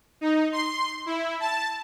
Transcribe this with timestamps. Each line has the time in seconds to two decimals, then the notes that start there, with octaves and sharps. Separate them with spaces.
0.21 D#4
0.52 C6
1.06 E4
1.40 A5